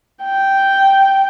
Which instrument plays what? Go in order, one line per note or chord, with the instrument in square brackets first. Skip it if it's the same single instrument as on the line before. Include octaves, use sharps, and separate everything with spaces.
[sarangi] G5